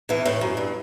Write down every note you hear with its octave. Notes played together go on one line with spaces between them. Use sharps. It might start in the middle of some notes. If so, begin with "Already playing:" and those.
E2 E3
A2
F#2
G2